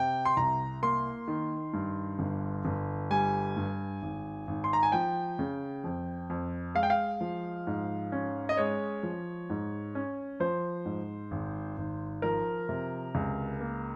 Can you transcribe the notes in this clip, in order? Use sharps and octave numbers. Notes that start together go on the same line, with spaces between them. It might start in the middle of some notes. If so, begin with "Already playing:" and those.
Already playing: C3 G5
C6
C2 A#5
A#3 C6
D#3
G2
G1
G1
G3 G#5
G2
G#1
G#1
C6
A#5
G#5
F3 G5
C#3
F2
F2
G#3 F5
G5
F5
F3
G#2
C#4
D#5
G#3 C#5
F3
G#2
C#4
F3 C5
G#2
G#1
G#1
F3 A#4
C3
C#2
A#3